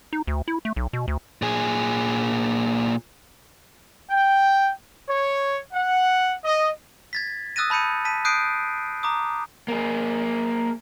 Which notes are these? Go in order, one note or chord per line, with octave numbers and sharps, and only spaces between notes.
D#4
D2
E4
A3
B1
B2
D2
A#2 G#4
G5
C#5
F#5
D#5
G#6 A6 B6
D#6 E6 F#6 A6 A#6 D#7
A5 B5 G6 C#7 D#7
A5 B6 D#7
D#6 F#6 G6 C7 D7 D#7
A#5 D6 D#6
A#3 G#4